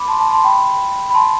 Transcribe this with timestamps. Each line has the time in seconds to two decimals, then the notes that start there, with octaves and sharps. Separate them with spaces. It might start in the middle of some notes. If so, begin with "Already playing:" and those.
Already playing: B5 D6
0.08 A5 C6
0.20 A5 C6
0.32 A5 C6
0.44 G5 B5
1.10 B5
1.14 A5 C6